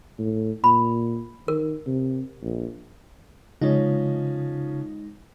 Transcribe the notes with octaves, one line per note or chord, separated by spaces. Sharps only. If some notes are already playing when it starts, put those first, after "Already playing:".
A2
A#2 B5
D#3 A#4
C3
A#1
C#3 F3 G#3 C#4 D#4